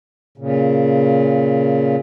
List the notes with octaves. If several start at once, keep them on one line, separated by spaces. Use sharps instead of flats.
A#2 C#3